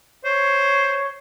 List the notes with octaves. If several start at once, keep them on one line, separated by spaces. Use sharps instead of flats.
C5 C#5